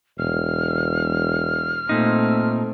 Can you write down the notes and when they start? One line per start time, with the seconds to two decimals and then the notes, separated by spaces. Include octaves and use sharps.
0.19 E1 F6
1.89 A#2 A3 C4 D#4